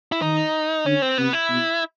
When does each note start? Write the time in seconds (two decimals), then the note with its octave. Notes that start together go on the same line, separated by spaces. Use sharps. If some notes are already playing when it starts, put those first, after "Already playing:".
0.12 E4
0.22 D#3 D#4
0.86 D3 C#4
1.02 C4
1.18 C3 B3
1.33 E4
1.49 B2